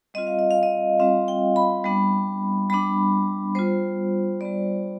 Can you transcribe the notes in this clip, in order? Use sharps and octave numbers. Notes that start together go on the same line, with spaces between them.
G3 C4 F4 D#5
F5
D#5
F5
D#5
G3 C4 F4 F5
G5
B5
G3 B3 D4
G3 B3 D4 B5
G3 B3 F4 C5
G3 B3 F4 D5